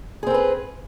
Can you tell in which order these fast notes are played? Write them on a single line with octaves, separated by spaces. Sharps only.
G#4 C4 A#4 B4